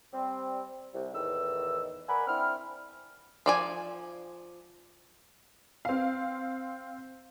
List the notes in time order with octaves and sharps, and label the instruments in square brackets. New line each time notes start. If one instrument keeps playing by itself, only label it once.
[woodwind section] G3 C4
C2
E2 A2 D#3 E3 D#4 E6
A#4 D5 F#5 G#5 B5
C4 D4 E4 F6
[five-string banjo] F3 D5 G#5
[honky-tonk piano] C4 F5